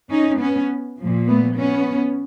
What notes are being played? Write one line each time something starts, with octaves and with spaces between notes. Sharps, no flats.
C#4 D#4
B3 C#4
A#2 F3
A3 B3
B3 C#4